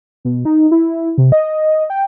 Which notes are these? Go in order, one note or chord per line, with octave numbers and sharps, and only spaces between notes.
B2
D#4
E4
C3
D#5
G5